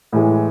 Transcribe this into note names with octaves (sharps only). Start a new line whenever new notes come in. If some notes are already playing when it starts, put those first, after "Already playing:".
A2 E3 G#3